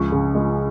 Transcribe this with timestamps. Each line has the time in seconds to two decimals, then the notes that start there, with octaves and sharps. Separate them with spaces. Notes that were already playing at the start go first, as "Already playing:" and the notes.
Already playing: C#2 F3 C#6
0.12 C#3
0.35 G#3